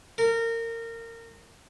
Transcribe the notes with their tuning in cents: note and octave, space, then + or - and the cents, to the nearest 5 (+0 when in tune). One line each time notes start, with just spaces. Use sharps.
A#4 -25